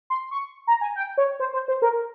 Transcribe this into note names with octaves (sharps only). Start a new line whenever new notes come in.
C6
C#6
A#5
G#5
G5
C#5
C5
C5
C5
A#4